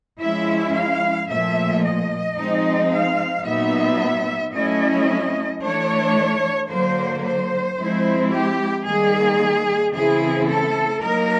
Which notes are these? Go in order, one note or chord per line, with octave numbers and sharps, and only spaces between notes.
F3 G#3 C#4 E4 E5
F5
A#2 F3 A3 E5
D#5
F3 G#3 C4 D#4
F5
A#2 F#3 B3 D#4 E5
F#3 A3 C#4 E4 D#5
E3 A3 D4 C#5
D3 F#3 A#3 C5
C5
F3 G#3 C4 E4
G4
D#3 G3 A#3 G#4
C#3 E3 A3 C4 E4 G#4
A4
F#3 A#3 D#4 A#4